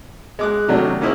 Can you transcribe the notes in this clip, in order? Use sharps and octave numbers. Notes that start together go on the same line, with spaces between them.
G#3 D6 F#6
C3 D#3 F#3 A3 C#4 D4
A#3 C#4 D#4 E4 G#4 C5